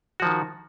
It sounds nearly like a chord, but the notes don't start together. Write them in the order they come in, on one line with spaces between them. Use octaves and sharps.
F#4 F3 D#3